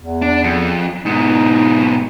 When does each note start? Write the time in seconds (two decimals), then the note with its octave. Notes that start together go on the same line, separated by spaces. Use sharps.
0.01 E2
0.22 D4
0.44 F2
1.06 G#2 B2 D#4